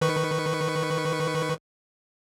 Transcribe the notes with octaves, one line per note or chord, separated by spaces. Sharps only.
D#3 B4 C#6